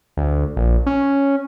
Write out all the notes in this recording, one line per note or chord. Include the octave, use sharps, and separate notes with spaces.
D2
A#1
C#4